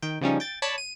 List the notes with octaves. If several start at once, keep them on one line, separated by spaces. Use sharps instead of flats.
D#3 G5
C#3 F3 G3 C#4 D#4
G5 A6
C#5 D5 A5 B5
D#7